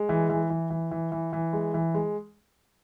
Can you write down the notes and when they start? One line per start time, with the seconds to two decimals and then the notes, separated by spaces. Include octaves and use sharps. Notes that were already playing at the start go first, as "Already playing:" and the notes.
Already playing: G#3
0.09 E3
0.29 E3
0.50 E3
0.70 E3
0.91 E3
1.12 E3
1.33 E3
1.53 G#3
1.74 E3
1.94 G#3